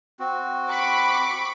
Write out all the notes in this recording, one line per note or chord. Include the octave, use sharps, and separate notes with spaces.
C4 F#4
B5 C#6 D6